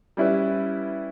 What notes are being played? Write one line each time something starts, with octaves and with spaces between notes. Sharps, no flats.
G3 C#4 E4 B4